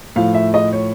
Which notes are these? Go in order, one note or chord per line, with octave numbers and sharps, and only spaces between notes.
A2 F3 F5
E5
D#5
C#5